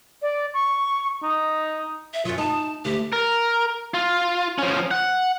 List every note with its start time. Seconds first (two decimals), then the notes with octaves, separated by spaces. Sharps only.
0.22 D5
0.54 C#6
1.23 D#4
2.14 E5
2.25 F#2 F#3 F4
2.38 D#4 A5
2.85 D2 G4
3.13 A#4
3.94 F4
4.58 F3 C#4
4.91 F#5